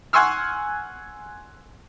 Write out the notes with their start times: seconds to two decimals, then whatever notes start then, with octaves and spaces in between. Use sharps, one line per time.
0.13 F#5 G#5 C6 C#6 E6 F6